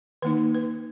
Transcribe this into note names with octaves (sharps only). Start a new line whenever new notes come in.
D#3 A#3 D#4 B4
B4